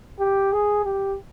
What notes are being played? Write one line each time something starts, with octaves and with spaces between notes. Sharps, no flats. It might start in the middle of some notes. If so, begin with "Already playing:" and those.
G4
G#4
G4